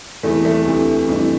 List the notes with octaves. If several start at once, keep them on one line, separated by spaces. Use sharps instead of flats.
E2 C3 E3 A3
A3
D2 C3 E3
G1 F2 C3 E3